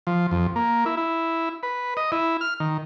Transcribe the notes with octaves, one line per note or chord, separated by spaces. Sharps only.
F3
F2
A#3
E4
E4
B4
D#5
E4
F6
D#3